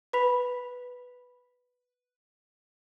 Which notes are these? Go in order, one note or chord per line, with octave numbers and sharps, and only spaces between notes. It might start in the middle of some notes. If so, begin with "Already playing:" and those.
B4 B5 B6 F7